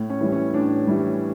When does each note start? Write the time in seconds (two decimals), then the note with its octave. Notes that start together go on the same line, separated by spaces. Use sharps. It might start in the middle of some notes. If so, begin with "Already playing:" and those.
Already playing: A2
0.09 C#4
0.21 E3 G3
0.32 C#4
0.54 A2 D4
0.87 E3 G3